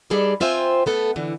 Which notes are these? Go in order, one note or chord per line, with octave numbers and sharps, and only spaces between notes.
G3 D#4 G#4 A4 B4 D5
C4 F4 C5 E5 G5 G#5
A3 B3 A4
D3 E3